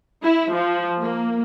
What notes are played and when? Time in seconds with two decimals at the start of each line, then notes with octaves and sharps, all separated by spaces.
0.23 E4
0.52 F3
0.98 A#3